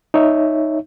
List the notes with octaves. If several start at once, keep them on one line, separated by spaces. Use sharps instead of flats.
D#4 C#5 E5